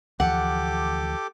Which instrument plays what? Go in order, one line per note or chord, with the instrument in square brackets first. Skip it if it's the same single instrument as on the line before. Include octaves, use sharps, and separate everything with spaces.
[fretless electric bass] D2 E3 F3 [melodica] G4 A4 D6 [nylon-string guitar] F#5